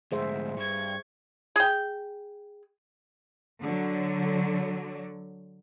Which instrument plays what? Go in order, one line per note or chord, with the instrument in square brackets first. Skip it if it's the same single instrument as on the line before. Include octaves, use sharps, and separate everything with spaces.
[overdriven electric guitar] D2 G#2 [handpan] G#4 C5 E5
[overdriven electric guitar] G2 [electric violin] C#6 G#6
[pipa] G#4 G5
[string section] D3 F#3